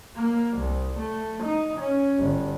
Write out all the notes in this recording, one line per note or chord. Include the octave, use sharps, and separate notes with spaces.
A#3
C2
A3
D#4
C#4
G1